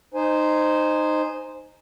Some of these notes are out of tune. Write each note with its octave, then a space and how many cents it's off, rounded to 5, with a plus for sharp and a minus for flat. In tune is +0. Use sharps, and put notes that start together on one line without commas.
D#4 -15 C5 -5 G#5 +0